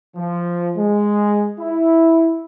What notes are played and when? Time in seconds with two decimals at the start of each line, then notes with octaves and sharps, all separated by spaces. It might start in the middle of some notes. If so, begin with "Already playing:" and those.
0.16 F3
0.76 G#3
1.59 E4